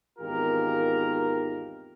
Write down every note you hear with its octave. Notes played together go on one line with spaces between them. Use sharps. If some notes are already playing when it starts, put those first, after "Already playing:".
G#1 E2 D#3 F4 G4 A#4